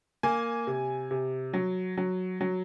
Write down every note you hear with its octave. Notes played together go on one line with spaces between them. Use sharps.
A#3 G#5
C3
C3
F#3
F#3
F#3